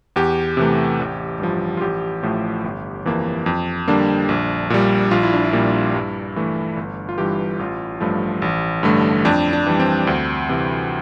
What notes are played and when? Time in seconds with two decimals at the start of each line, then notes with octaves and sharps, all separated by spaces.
0.16 E2 G4
0.57 C3 E3 A3
0.99 A1
1.40 G2 F3
1.77 F4
1.81 A1 G4
2.23 A2 F3 A3
2.64 G1
3.06 F2 E3 A#3
3.46 F2
3.88 D3 G3 A#3 D4
4.29 A#1
4.70 A#2 G3
5.11 A#1 F4
5.23 E4
5.34 D4
5.44 E4
5.53 A#2 G3 A#3
5.94 G2
6.36 E3 A3
6.77 G1
7.09 F4
7.18 G2 E3 G4
7.59 A1 F4
8.00 G2 F3 A3
8.42 A1
8.83 G2 D3 A3
9.25 F2 D4
9.53 D4
9.66 E3 G3
9.80 C4
10.07 D2
10.49 C3 E3